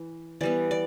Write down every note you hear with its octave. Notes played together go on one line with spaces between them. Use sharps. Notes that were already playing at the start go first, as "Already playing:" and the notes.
Already playing: E3
E3 G3 B3 D5
D5